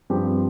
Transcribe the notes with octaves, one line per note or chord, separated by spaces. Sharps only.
G2 F3 C4 G4 C5